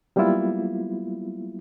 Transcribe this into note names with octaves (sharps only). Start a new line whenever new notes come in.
F#3 G3 A#3 B3 E4 F4